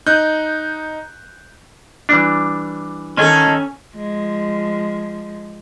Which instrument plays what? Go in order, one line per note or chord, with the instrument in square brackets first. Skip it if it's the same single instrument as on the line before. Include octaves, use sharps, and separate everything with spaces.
[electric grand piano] D#4 F#6 G6
[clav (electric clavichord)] E3 G3 D4
[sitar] D#3 A4 [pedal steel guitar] C#4 G#5
[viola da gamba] F3 G#3